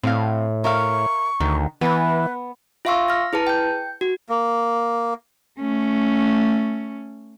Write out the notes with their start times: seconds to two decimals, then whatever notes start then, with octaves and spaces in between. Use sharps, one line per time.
0.04 A2 C4 F5
0.64 A#4 E5 F5 C#6
1.40 D2 D#3
1.81 E3 B3 B4
2.85 F4 E5 F5 C6 C#6 E6
3.08 F6 A#6
3.33 E4 G#4 B4 A5
3.47 G5 G6
4.01 F#4
4.29 A#3
5.60 A3 C#4